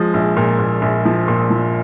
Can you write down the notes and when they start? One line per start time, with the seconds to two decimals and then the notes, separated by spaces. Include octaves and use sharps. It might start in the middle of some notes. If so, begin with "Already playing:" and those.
Already playing: F3 G#3
0.14 A#1
0.37 A#2
0.59 A#2
0.82 A#1
1.05 F3
1.28 A#2
1.50 F3